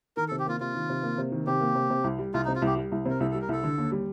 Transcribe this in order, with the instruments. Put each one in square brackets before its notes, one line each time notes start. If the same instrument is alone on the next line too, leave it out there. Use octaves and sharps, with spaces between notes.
[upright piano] D#3 [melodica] A#4
[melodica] A4
[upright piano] C3
[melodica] G4
[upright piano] A#3 [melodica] F4
[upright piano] C3 [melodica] F4
[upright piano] D#3
C3
A#3
C3
D#3
[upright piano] C3 [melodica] G4
[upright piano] A#3
C3
C3
C2
G3
[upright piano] C2 [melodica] F4
[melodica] D#4
[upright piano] C3
[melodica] F4
[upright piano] C2 [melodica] G4
[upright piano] G3
C2
C3
[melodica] A#4
[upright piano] C2 [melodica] A4
[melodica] A4
[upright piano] G3
[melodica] A#4
[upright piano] C2 [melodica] A4
[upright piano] D3
D#2
G3